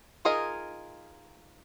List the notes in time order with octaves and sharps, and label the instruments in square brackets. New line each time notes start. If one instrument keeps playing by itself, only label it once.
[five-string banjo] D#4 F4 G#4 A#4 D#5